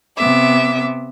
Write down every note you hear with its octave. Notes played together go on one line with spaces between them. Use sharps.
C3 B3 E5 D6